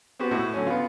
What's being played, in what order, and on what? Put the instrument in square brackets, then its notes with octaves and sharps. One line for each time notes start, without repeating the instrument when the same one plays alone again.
[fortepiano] B3 C4 F#4 G4
A2 E4 F#4
D3 F#3 C#4
B3 F4